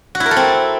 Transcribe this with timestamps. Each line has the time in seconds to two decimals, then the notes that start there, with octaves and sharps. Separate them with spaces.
0.15 F#4
0.20 E4
0.26 A#4
0.31 A4
0.36 C4